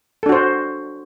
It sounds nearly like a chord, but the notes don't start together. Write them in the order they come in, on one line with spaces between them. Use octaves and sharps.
A4 D4 F#4 C5